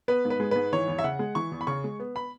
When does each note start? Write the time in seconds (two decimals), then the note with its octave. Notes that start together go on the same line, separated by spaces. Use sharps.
0.08 B3 B4
0.25 G#2
0.30 B4
0.40 G#3
0.51 G#2 B4
0.73 E3 C#5
0.88 E2
0.99 E5
1.04 C#3 F#5
1.19 G#3
1.35 E3 C#6
1.52 E2
1.61 B5
1.67 C#3 C#6
1.84 G#3
1.99 B3
2.16 B5